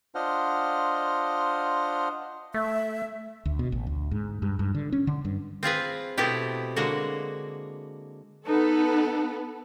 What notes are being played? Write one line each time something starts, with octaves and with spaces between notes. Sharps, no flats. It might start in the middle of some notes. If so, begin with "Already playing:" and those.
D4 F4 C5 D#5 F#5 F6
A3 E5
D2
B2
A1
D2
G#2
G2
G2
D3
C#4
D3
G2
C4 F4 G#4 B4
B2 A3 B3 C4 E4 G4
D3 G#3 A#3 F#4
B3 D#4 A4 B4